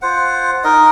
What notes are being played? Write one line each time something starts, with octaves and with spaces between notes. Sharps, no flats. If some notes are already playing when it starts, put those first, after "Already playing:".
F4 C5 F#5
D#4 A#4 D#5